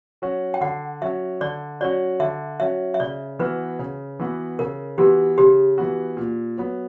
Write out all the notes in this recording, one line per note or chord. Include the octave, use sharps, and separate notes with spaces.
F#3 C#4 F#4
G5
D3 F#5
F#3 C#4 F#4 E5
D3 D5
F#3 C#4 F#4 D5
D3 E5
F#3 C#4 F#4 E5
E5
C#3 D5
E3 B3 F#4 B4
C#3
E3 B3 F#4
C#3 A#4
E3 B3 F#4 G4
C#3 G4
E3 B3 F#4
A#2
F#3 B3